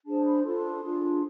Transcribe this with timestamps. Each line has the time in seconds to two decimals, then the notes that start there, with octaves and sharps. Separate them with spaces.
0.06 D4 G#4 C5 A5
0.25 B5
0.44 D4 F4 A4 C6
0.82 D4 F4 G#4